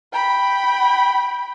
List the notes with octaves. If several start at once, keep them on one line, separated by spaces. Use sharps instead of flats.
G5 B5